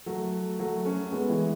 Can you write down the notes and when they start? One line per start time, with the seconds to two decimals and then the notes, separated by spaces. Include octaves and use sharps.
0.06 F#3 A3
0.59 F#3 A3
0.85 A3 C#4
1.12 G#3 B3
1.29 E3 G#3